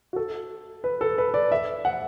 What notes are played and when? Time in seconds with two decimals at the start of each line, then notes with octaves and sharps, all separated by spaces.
0.13 F#4
0.16 A4
0.84 B4
1.01 A4
1.18 B4
1.34 D5
1.52 E5
1.85 F#5